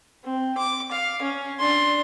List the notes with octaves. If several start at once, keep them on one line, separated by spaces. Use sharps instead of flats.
C4
D6
F5
C#4
D4 C6